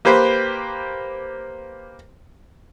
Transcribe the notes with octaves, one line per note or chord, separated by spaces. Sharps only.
A#3 G4 B4 C5